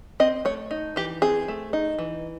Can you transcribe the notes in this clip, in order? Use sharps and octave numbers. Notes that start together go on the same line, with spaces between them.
C4 D#5
A3 C#5
D#4
E3 G4
C4 G#4
A3
D#4
E3